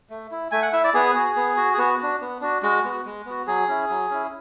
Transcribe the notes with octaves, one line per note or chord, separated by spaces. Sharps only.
A3
E4
A3 G#5
F#5
E4 E5
D5
B3 G#4
F#4
B3
F#4
G#4
B3 F#4
D4 F#4
B3
D4 F#4
G#3 F#4
B3 F#4
G#3
B3 F#4
F#3 G#4
C#4 E4
F#3
C#4 E4